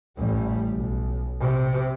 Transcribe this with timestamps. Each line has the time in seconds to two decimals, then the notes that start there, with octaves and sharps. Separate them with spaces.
0.17 A1 G3
0.72 B1
1.40 C3